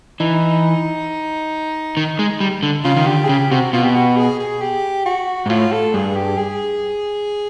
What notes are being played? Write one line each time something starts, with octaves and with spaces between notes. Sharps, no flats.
E3 D#4
D#3
G#3
G3
D3
C#3 F4
D#3
D3 G4
G#4
C#3 G4
C3 F#4
B2 F4
G4
F#4
G#4
G#4
G4
F#4
G#2
A2 F4
A4
G2 G#4
G4
G#4